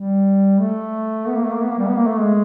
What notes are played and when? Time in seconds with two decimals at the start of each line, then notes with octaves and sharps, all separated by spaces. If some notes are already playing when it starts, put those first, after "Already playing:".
Already playing: G3
0.60 A3
1.28 B3
1.36 A#3
1.45 A3
1.53 A#3
1.62 B3
1.71 A#3
1.79 G3
1.88 B3
1.96 A#3
2.07 A3
2.19 G#3